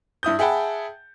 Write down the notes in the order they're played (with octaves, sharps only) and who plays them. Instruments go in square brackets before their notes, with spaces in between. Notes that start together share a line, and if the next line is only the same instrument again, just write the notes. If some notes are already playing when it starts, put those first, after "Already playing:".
[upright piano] G2 E4 D#6 G6
G#4 E5 F#5 G5 A5 B5